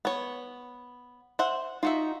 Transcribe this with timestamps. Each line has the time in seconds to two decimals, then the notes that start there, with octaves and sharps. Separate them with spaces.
0.05 B3 C#5
1.39 C5 E5 F#5
1.83 D#4 F4 F#4 E5